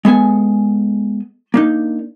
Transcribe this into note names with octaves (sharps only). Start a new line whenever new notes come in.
G#3 B3 A4 G#5
A#3 D4 D#4